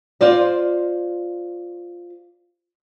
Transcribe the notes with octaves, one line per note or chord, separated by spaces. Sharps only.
F4 C5 D5 D#5